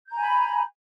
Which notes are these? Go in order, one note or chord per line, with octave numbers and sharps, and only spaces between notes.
G#5 A#5 B5 G6